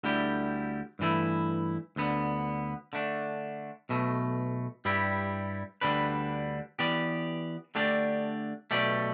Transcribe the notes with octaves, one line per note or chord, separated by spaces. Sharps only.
D2 D3 G3 E4 G4
G2 E3 A3 E4
D2 D3 B3
D3 A3 D4
B1 B2 A3
G2 G3 E4 G4
D2 D3 G3 D4 B4
E3 B3 G4 D5
D3 A3 D4 G4 D5
B1 B2 A3 G4 D5